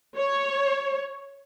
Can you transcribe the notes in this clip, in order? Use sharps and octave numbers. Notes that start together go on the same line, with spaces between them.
C#5